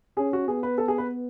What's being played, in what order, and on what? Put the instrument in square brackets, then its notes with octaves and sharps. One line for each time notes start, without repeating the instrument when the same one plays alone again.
[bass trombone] C#4 [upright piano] G#4
[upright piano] F#4
[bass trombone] B3 [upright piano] G#4
[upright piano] B4
A4
G#4
B4